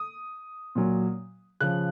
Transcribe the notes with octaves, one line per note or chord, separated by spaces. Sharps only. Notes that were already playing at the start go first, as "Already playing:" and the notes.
Already playing: D#6
A#2 F#3
C#3 F3 F#6